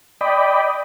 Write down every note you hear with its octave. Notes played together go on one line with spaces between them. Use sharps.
D5 D#5 G5 B5